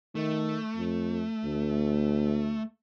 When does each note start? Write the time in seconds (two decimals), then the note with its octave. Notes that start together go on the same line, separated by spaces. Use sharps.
0.15 D#3 A3
0.77 F2
1.44 D2